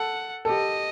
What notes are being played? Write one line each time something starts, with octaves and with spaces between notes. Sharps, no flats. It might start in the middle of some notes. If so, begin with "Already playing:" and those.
Already playing: A4 F#5
A4
G4 D#5